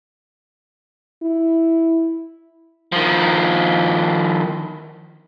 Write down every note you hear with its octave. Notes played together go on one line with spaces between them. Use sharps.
E4
D#3 F3